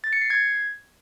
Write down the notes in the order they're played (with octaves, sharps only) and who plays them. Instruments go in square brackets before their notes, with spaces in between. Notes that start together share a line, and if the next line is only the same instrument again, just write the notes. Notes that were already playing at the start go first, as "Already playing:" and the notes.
[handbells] A6
C#7
C7
G#6